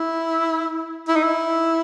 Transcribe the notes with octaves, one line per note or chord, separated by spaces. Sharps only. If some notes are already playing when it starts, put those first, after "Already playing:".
Already playing: E4
E4
D#4
E4